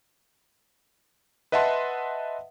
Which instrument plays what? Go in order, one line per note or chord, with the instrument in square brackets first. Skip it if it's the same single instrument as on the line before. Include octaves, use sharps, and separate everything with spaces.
[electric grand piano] B4 D#5 E5 F#5 A5 C6